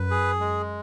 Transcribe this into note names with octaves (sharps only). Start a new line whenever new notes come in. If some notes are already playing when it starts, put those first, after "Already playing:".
Already playing: F#2 B4
G#4
G#3